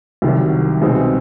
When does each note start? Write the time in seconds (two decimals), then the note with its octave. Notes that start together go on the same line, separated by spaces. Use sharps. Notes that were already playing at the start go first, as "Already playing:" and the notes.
0.22 C2 C3 D#3 F#3
0.82 C2 B2 G#3 C4 D#4